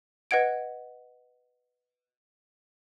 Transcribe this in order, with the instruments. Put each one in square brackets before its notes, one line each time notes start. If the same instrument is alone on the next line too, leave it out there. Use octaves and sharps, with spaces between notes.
[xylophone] B4 D#5 F#5 G#6 D7